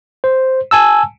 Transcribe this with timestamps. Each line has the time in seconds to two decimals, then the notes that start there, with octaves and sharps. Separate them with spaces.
0.24 C5
0.71 G#5 A5 E6